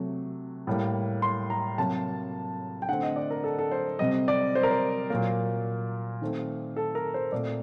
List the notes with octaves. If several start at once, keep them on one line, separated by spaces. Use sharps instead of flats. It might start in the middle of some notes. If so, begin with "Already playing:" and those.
Already playing: C3 F#3 A3
A2 G3 A#3
C6
A#5
C3 F#3 A#3 A5
G5
D3 A3 C4 F#5
D#5
D5
A#4
A4
A4
C5
C3 G3 C4 D#5
D5
C5
A#4
C5
A#2 F#3 A#3
D#3 A3 C4
A4
A#4
C5
A#2 A3 C4 D5